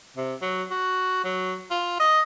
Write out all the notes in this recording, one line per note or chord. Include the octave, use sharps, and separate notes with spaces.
C3
F#3
F#4
F#3
F4
D#5